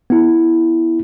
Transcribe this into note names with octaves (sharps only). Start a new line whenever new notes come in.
B3 E4